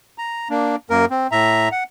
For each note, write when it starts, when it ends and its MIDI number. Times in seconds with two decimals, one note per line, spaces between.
0.18 0.48 82
0.50 0.76 58
0.50 0.76 62
0.90 1.05 42
0.90 1.05 58
0.90 1.05 70
1.10 1.27 60
1.31 1.69 45
1.31 1.69 76
1.31 1.69 82
1.72 1.84 78